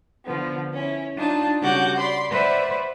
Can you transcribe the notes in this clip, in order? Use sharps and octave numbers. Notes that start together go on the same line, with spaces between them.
D3 F3 B3
C#4 E4
D4 D#4 F4 A5
C#3 G3 F#4 F#5 D6 G6
D5 B5 C6
B4 C5 D5 E5 F#5